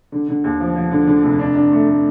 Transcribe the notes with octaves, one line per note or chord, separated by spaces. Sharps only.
D3
D3
D#2
F3
F3
D3
D3
F1
D4
D4
A3
A3